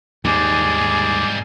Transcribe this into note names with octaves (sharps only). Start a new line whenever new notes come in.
D#2 G#2 G3 G#4 D6